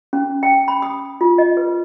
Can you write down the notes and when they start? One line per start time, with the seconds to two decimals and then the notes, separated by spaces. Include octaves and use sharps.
0.13 C#4
0.43 G5
0.68 B5
0.82 D#6
1.21 F4
1.38 D#5
1.57 B4